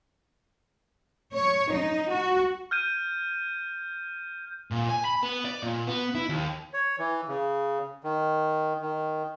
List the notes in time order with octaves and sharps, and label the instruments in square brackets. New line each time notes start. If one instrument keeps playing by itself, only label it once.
[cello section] C#5
D#4
F#4
[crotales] F6 G6 D#7
[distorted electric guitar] A#2
G#5
B5
B3
D5
A#2
B3
E4
D#2
[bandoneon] C#5
E3
C#3
D#3
D#3